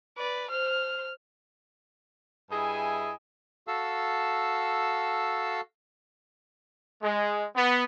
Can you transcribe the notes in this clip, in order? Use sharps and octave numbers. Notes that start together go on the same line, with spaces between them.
B4 D5
C5 F6
G2 E4 G#4 D#5 E5 G#5
F#4 A4 F5 A5 E6
G#3
B3